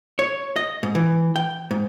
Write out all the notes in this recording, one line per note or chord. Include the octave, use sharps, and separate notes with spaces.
C#5
D#5
G#2
E3
G5
G#2